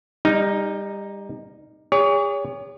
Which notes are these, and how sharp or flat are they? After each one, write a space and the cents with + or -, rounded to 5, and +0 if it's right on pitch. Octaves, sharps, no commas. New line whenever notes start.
G3 +25 D#4 +0
G#4 -40 C#5 +35